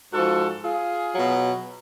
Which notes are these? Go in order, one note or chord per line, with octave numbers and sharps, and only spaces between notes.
G#2 F3 F#4 A4
F4 G#4
B2 F#3